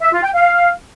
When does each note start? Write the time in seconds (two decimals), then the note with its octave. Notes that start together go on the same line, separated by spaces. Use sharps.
0.01 E5
0.12 F4
0.23 G5
0.34 F5